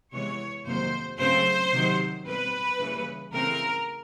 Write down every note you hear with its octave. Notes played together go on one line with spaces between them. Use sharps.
C3 E3 G#3 B3 C#5
F2 C3 D#3 F#3 A#3 C5
C#3 F#3 A3 C4 C5
C3 D#3 F#3
B2 G3 C4 B4
C#3 E3 G3 A#3 C#4
C#3 E3 A3 C4 A#4